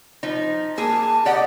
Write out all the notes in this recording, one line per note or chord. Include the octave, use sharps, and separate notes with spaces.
F3 D#4
A#3 G#4 A5
G4 D5 D#5 F#5